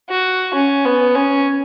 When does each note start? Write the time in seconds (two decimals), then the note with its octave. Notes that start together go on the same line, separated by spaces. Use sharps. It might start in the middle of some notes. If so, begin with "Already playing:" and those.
0.10 F#4
0.55 C#4
0.85 B3
1.15 C#4